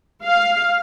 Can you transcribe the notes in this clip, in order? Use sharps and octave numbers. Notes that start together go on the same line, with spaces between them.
F5